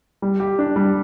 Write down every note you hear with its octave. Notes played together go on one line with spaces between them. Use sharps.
G3
G4
D4
G3